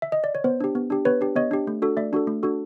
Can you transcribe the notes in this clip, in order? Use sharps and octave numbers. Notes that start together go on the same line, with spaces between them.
E5
D#5
D5
C#5
B3 C5
D4 G4
B3
D4 G4
B3 B4 C#5
D4 G4
B3 C#5 D#5
D4 G4
A3
D4 F#4 A4
A3 D5 E5
D4 F#4 A4
A3
D4 F#4 A4